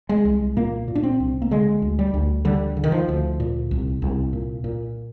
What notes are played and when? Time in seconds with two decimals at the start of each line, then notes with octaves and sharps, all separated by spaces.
0.09 G#3
0.25 C2
0.56 A#2 A#3
0.88 A#2
0.95 D4
1.03 C4
1.20 C2
1.42 A#3
1.51 D3 G#3
1.82 D2
1.99 G3
2.14 D2
2.45 D3 G3
2.77 D3
2.84 D#3
2.92 F3
3.08 D2
3.40 A#2
3.71 C2
4.02 C2
4.33 A#2
4.64 A#2